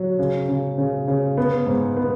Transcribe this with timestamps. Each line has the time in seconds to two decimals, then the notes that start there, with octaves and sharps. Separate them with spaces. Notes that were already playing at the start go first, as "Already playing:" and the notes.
Already playing: F#3
0.19 C#3
0.49 C#3
0.78 C#3
1.07 C#3
1.37 B3
1.67 G#2
1.97 B3